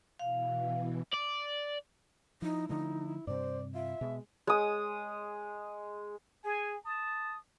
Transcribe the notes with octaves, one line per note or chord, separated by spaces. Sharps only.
B2 E3 F5
D5
F3 D#4 E4
D3 F3 A3 D#4
G2 C3 C5 D5
F4 E5
B2 G#3
G#3 D#6
G#4 G#5
A5 D#6